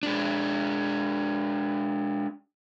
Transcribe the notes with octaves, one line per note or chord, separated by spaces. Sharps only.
G#3 D4